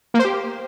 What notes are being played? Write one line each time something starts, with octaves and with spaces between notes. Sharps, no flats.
A#3
C5
G4